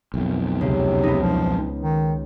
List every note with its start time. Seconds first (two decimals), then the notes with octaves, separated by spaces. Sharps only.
0.14 B1 F2
0.61 C#2 C3
1.03 B3 D#4
1.21 F3
1.80 D#3